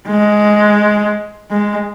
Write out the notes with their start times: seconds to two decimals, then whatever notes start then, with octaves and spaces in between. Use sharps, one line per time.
0.08 G#3
1.51 G#3